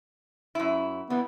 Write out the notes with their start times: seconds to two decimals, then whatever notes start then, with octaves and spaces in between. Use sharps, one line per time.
0.55 F#2 E4
1.10 E3 G3 B3